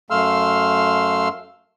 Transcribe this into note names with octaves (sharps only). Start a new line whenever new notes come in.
F#2 A3 F5 C6 E6 F6